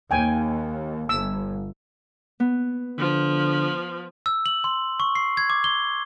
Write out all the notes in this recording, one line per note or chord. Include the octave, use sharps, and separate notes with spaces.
D#2 G5 G#5
G1 E6
B3
D3 F3
E6
F#7
C6
C#6
C7
G#6
D6
G7